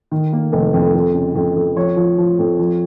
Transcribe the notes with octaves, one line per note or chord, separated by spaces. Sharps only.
D#3
A#3
F1
F2
F2
C#3
F2
F2
F3 C#5
F3
F3
F2
F3